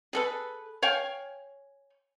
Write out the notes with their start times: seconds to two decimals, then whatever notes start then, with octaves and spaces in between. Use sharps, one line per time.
0.13 G#4 A4 B4
0.82 C#5 F5 G5 G#5